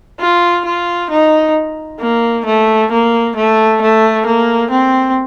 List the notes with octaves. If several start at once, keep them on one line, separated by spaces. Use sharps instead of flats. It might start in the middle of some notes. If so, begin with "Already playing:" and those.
F4
F4
D#4
A#3
A3
A#3
A3
A3
A#3
C4